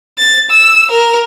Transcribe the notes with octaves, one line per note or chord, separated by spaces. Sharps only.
A6
E6
A#4